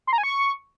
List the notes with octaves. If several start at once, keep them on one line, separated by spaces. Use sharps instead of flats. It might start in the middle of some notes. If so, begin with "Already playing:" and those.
C6
A#5
G#5
C#6